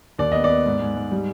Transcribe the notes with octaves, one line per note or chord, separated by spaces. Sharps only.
D#2 D5
B3 D#5
D5
B3
G#2
G#2
G#2
G3